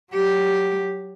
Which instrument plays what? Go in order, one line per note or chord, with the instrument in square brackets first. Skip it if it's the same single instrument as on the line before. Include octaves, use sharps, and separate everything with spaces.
[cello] F#3 G4